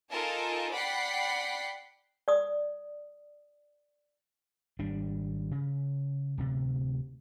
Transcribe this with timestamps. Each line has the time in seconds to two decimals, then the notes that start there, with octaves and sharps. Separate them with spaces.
0.12 D#4 F4 A4 A#4 G#5 A5
0.74 D5 F#5 G5 B5 B6 C7
2.28 D5 D#6
4.79 G#1 G3 D4
5.51 C#3
6.38 D1 C3